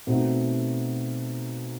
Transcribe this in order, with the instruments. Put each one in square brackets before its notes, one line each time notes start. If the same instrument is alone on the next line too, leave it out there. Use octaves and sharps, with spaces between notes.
[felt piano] B2 A3 C4 D#4 F#4